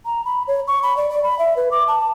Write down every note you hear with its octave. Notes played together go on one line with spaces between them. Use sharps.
A#5
B5
C#5
C#6
B5
D5
D5
B5
E5
B4
D6
A5